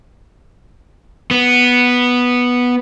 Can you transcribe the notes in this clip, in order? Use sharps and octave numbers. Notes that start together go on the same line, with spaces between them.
B3